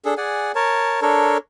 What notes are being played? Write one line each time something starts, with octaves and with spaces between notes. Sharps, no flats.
D4 G#4 A4
G#4 D5 F#5 G#5
A#4 C#5 A5
D4 A4 A#4 C#5